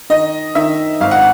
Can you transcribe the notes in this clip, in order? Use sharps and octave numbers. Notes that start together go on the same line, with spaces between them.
D#3 D#5
D#3 E5
G#1 F5
F#5